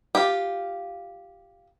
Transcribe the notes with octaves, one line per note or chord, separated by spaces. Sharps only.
F4 G4